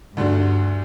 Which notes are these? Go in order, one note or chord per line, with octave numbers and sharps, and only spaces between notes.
D2 G2 D3 A3 D4 F#4